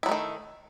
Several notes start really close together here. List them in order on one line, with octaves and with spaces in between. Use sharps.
E4 F#3 A3 D#3